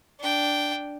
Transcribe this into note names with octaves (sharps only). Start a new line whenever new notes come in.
D4 G5